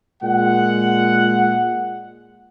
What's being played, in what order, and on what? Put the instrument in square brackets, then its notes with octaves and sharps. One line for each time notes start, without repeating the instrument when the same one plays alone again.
[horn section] A#2 G#3 F#5